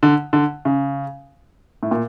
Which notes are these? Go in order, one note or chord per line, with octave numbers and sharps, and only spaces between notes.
D3
D3
C#3
A2
A#2